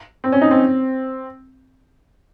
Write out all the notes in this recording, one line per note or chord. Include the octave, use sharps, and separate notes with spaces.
C4
C#4
D#4
C4